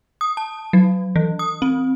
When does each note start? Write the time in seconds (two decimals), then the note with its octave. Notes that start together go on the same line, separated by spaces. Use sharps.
0.21 D#6
0.37 A5
0.73 F#3
1.16 E3
1.39 D#6
1.62 C4